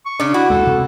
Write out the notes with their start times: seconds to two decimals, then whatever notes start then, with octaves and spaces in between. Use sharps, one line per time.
0.06 C#6
0.20 C#3 D4
0.34 E4 F#4
0.50 D2 G#3 A#3 A4
0.67 C3